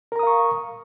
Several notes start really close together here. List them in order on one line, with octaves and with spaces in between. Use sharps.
A#4 A#5 D#6 F5 C#6